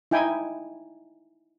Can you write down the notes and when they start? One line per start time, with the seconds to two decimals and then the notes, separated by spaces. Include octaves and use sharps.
0.11 D#4 E4 G5 G#5